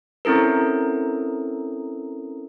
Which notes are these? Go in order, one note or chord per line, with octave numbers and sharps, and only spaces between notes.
C4 C#4 E4 A4 A#4